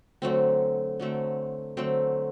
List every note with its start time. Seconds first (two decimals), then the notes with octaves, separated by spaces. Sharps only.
0.22 D3 F#3 A3 C4
1.00 D3 F#3 A3 C4
1.77 D3 F#3 A3 C4